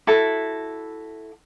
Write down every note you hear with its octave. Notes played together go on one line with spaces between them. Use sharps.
E4 F#4 A4